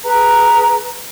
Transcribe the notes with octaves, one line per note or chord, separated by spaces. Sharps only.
G#4 B4 A#5